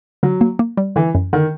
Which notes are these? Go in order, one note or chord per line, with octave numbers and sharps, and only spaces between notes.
D3 F#3
A#3
A#3
G3
D3 E3
F#2
D3 D#3